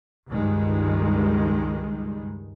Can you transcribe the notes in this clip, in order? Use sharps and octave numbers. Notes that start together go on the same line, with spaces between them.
C#2 G2 D#3 G3 G#3